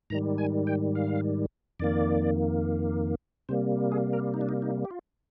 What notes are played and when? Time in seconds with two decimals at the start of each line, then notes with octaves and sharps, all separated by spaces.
0.10 G#2 D#3 G3 A#5
0.38 G#5
0.67 G5
0.95 F5
1.80 F2 D#3 A#3 D5
3.49 C3 G3 A#3 C5
3.92 G#4
4.13 A#4
4.34 D#4
4.41 D4
4.49 D#4
4.62 D#4
4.85 G4
4.91 F4